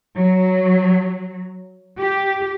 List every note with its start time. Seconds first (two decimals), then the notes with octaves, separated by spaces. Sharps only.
0.15 F#3
1.99 G4